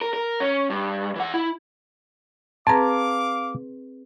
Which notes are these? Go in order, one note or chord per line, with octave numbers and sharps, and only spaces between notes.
A#4
A#4
C#4
G2
E3 F#5
E4
C4 G#4 B4 F5 A5 A#5 D6